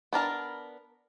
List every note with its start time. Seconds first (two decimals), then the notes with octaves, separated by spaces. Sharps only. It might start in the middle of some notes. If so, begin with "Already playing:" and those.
0.13 B3 D4 A#4 A5